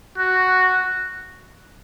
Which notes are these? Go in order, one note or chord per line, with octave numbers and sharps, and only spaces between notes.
F#4